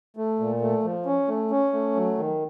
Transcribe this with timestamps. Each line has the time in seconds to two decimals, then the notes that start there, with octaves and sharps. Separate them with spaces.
0.17 A3
0.39 A#2
0.61 A3
0.84 F3
1.06 C#4
1.28 A3
1.51 C#4
1.73 A3
1.95 F#3
2.18 D#3